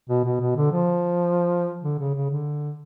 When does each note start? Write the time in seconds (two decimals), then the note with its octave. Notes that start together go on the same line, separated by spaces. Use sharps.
0.09 B2
0.25 B2
0.40 B2
0.56 D3
0.72 F3
1.83 D3
1.99 C#3
2.15 C#3
2.30 D3